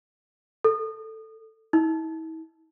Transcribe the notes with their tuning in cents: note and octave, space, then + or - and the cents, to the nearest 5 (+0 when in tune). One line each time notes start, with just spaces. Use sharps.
A4 +5
E4 -45